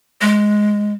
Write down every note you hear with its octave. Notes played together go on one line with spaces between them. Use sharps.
G#3